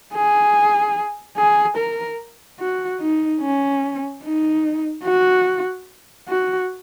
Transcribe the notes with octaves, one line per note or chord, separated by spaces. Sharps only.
G#4
G#4
A#4
F#4
D#4
C#4
D#4
F#4
F#4